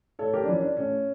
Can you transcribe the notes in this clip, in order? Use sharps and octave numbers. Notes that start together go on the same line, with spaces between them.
A2 A4 C#5
G4 A#4
D4
F3 C#4 E4
D4
A2 C#4